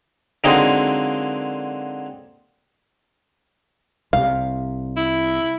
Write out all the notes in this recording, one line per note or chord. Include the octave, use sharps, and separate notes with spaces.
D3 F#3 G#3 A#3 C4 D#4
C2 C3 F5
E4